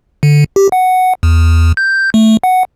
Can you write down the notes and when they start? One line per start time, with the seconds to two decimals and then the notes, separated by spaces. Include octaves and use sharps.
0.23 D3
0.56 G4
0.72 F#5
1.23 E2
1.77 G6
2.14 A3
2.44 F#5